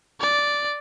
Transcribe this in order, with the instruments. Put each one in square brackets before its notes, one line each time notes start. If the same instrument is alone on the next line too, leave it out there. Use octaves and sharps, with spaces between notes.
[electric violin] D5